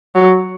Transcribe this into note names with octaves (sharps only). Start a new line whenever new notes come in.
F#3